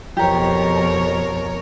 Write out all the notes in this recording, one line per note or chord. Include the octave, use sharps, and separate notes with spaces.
F2 B2 G4 A#4 C#5 A#5